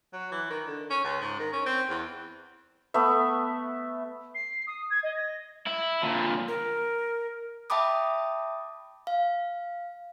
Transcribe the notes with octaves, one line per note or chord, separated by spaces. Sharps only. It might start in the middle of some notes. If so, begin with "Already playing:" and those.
F#3
E3
D#3
D3
C#4
C#2
G#2
D#3
C#4
C4
E2
A3 B3 E5
C7
D#6
G#6
D#5
A#6
E4
A#2 D3
A#4
E5 G5 A5 B5 D6 D#6
F5